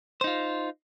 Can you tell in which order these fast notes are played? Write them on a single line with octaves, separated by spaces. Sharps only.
C5 D#4 F4